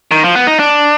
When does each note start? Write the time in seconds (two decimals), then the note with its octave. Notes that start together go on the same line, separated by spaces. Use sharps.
0.11 D#3
0.24 F3
0.35 B3
0.47 D#4
0.59 D4